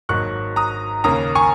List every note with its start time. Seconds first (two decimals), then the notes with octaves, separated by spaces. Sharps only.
0.09 G#1 G#2 F#3 A#3 C#6 F#6
0.56 A#5 D#6
1.04 D#2 C#3 A#3 A#5 D#6
1.35 G#5 C#6